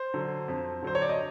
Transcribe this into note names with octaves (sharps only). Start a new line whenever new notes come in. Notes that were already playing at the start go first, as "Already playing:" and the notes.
Already playing: C5
D3 F#3
F2
D3 F#3 C5
C#5
D5
D#5